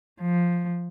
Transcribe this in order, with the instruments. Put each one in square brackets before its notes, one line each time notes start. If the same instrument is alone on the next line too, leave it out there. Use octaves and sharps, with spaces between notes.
[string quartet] F3